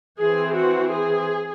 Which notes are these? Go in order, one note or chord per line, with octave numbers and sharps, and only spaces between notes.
E3 C4 G#4
F#4
G#4